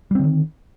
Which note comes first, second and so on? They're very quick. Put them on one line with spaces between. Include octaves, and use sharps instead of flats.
G3 C4 D3 D#3